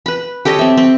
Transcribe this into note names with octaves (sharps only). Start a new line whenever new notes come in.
B4 B5
G4 A4 C#5 D#5
C4 E5
C4